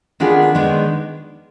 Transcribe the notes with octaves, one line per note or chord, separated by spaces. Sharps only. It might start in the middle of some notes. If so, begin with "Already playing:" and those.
D#3 B3 D4 F4 G#4
D#3 G#3 B3 D4